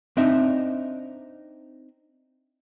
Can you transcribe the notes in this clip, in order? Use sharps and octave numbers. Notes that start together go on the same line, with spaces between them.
C4 D4 D#4 E5